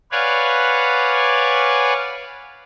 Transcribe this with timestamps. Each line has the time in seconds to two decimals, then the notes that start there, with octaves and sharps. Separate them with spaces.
0.12 B4 C#5 D5 F5 F#5 G#5